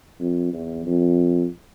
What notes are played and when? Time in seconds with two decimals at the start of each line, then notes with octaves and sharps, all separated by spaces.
0.19 F2
0.53 E2
0.86 F2